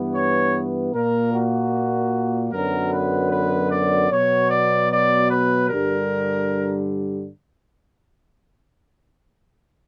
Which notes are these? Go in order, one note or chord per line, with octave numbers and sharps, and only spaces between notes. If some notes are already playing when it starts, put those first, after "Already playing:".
Already playing: G2 E3 B3
C#5
A#2 A#3 A#4
F#4
F#2 D3 F#3 B3 A#4
B4
B4
D5
B2 F#3 B3 C#5
D5
D5
B4
G2 D3 G3 A#4